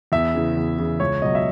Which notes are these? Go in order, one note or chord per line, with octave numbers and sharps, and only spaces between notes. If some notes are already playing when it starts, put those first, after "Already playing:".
E2 E5
C#3 E3
E2
C#3 E3
C#2 C#5
B2 F#3 D#5
E5